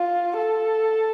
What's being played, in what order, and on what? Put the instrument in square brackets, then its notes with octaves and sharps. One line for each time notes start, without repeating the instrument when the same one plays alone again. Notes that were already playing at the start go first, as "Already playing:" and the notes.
Already playing: [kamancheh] F4
A4